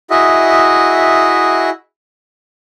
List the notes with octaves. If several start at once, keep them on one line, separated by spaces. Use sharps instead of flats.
E4 F#4 G#4 D#5 E5